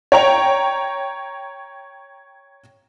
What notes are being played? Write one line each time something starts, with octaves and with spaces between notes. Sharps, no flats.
C#5 G5 A#5 F7